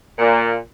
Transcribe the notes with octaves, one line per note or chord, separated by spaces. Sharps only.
A#2